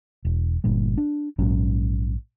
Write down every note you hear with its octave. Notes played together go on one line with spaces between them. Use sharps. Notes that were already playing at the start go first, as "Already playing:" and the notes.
E1
G1 G2 A#2 G3
D4
A#1 G#2 F#3 C#4